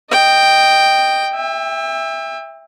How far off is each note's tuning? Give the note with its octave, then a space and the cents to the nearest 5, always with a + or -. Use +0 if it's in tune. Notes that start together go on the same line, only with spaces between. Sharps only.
D#5 -10 G5 +0
E5 +0 G5 +40